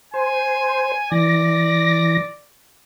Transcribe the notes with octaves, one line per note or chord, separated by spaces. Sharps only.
C5 G#5
E3 D5 A#6